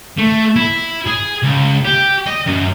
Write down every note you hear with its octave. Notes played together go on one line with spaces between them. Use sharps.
A3
E4
G#4
C#2
G4
D#5
F#2